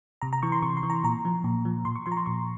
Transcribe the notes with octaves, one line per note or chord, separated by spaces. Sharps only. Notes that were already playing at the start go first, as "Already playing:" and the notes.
C3 A#5
A#5
E3 C#6
C6
C3 C#6
C6
E3
A#5
A#2 A#5
F3
A#2
F3
A#2 C6
C#6
F3 C6
A#5
C6
A#2 C#6